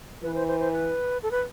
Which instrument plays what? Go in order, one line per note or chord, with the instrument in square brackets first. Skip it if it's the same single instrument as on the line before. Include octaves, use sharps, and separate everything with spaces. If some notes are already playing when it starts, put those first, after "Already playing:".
[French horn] E3 [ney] B4
[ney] C5
C5
C5
B4
A4
B4